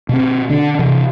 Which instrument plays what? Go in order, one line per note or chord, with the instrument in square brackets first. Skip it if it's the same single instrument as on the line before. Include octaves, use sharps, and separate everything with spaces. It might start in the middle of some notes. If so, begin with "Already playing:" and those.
[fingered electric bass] B2 C4
D3 D4
C3 E3